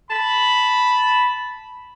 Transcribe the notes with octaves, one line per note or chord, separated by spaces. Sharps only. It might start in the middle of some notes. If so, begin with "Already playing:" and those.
A5 B5